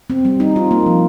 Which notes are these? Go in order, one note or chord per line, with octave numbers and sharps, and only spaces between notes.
C4
G3
D#4
F4
A#3
F3